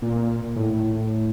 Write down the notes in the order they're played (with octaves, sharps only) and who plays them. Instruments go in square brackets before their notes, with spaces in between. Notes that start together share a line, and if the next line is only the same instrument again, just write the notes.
[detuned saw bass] A#2
A2